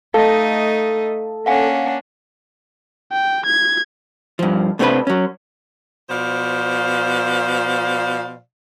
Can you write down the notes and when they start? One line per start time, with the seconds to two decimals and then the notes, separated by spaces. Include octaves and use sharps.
0.14 A3 D#4 A4 D#5 F5
1.46 A#3 C#4 D4 F5 F#5 G#5
3.12 G5
3.46 G#6
4.39 G2 F3
4.79 C3 A3 C4 D4 E4 B4
5.07 F#3 C#4
6.10 B2 F3 C5 D5 F5